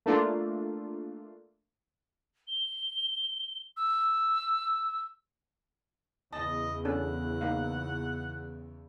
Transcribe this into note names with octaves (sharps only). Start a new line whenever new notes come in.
A3 A#3 D4 F4
G7
E6
E2 C#3 D#5 A5
C#4 D4 A4 F#5
A#3 D#4 F5